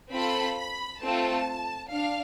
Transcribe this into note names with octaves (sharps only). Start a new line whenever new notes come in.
C4 F4 A4 B5
B5
A3 C4 F4 A4 A5
D4 F5